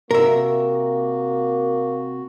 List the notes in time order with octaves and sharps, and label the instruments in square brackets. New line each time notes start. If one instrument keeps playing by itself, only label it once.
[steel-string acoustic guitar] C3 [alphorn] A#3 [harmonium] F#4 [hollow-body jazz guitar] A#4 E5